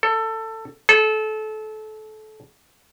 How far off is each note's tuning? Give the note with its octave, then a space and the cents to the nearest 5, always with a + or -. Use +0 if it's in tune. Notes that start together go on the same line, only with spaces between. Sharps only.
A4 +20
A4 -25